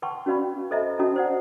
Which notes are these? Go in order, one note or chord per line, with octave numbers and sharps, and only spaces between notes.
B4 F#5 G5 A5 C6 C#6
C#4 F#4 B4 D5 F5 B5
A4 C5 D#5 E5 A5 A#5
C#4 F#4 A5 A#5 D#6
C5 D5 F#5